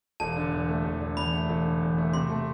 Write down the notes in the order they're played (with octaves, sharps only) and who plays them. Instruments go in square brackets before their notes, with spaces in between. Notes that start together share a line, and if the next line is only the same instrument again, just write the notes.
[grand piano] E1 [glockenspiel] A5
[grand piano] D3
E2
A3
E1
D3
[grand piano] E2 [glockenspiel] B5
[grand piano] A3
E1
D3
E2
A3
[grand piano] C3 [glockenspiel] C6
[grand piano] A3